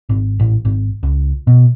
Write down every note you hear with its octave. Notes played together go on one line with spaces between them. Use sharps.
G#1
A1
G#1
C#2
B2